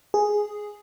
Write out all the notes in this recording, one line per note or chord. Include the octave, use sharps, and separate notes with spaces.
G#4